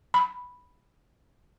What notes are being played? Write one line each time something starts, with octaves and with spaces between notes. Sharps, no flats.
B5